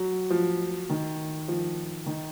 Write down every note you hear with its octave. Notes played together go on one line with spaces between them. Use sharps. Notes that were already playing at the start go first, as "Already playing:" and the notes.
Already playing: F#3
F3
D#3
F3
D#3